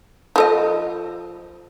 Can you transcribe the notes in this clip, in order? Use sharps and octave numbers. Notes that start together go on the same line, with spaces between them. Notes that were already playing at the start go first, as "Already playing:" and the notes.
F3 A4 D#5